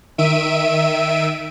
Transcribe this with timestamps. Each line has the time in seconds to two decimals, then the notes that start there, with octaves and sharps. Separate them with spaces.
0.18 D#3 E5 D7 D#7